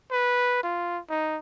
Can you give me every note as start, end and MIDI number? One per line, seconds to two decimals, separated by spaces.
0.11 0.61 71
0.63 0.99 65
1.09 1.38 63